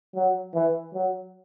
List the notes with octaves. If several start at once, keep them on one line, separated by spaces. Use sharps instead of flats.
F#3
E3
F#3